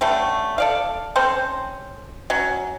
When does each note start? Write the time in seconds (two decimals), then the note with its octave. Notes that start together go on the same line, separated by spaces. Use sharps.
0.01 D3 G3 A3 C#4
0.58 A4 D5 F5
1.16 C4 C#4 A4 C5
2.30 F#3 C#4